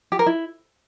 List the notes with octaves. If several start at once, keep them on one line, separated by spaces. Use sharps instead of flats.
G4
A#4
E4